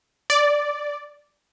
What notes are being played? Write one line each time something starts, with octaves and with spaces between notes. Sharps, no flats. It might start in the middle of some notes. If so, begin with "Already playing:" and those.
D5